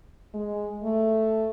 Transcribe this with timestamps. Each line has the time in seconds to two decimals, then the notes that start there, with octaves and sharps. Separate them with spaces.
0.34 G#3
0.83 A3